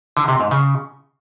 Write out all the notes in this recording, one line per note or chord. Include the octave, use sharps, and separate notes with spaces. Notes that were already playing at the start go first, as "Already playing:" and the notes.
D3
C3
G#2
C#3